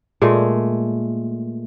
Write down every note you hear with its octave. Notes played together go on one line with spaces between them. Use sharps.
A#2 G#3 A3